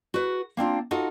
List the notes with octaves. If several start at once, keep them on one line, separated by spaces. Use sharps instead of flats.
F#4 B4
A#3 C4 D4 F4
D#4 F4 F#4 A4